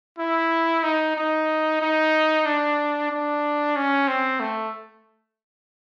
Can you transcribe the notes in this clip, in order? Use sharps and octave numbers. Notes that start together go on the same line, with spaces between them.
E4
D#4
D#4
D#4
D4
D4
C#4
C4
A3